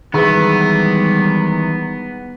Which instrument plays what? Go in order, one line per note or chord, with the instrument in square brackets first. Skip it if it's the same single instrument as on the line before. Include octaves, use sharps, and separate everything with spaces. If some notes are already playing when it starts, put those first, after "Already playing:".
[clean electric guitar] D#3 E3 E4 [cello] G3 G#3 [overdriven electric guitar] B3 [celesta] G#4 B4